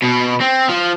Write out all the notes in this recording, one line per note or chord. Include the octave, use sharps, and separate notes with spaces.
B2
C4
F3